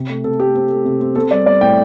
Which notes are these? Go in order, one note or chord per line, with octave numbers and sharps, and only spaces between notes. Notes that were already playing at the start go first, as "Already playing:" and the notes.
Already playing: C3
A3
C3 A4
A3 G4
C4
A3
C3
C4
C4 A4
G3 D5
G3 D5
A2 G5